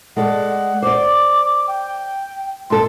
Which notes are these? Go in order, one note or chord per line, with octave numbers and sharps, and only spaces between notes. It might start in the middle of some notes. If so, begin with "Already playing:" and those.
G#3 A4 D5 F#5
C5 D5 D6
G5
G#2 A4 C6